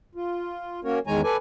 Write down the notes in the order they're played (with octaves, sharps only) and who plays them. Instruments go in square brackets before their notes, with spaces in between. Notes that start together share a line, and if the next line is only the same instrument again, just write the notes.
[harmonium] F4
A#3 C#4 F#4 A#4 C#5
E2 D#3 G#3 C#5 G#5 A#5
A4 B4 D5 G#5